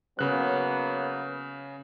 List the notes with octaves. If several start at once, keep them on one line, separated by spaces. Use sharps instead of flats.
C#3 F#3 A#3 B3 F#6